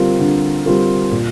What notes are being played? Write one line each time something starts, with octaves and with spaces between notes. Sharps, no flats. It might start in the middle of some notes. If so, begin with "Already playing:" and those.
Already playing: D3 G3 C4 F4 A#4
D3
G3 C4 F4 A#4
A#2